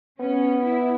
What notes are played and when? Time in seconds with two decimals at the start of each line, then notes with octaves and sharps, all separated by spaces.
0.20 B3 C#4
0.63 E4